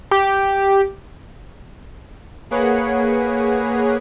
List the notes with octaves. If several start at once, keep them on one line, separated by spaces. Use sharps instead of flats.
G4
A#3 G#4 B4 C#5 F#5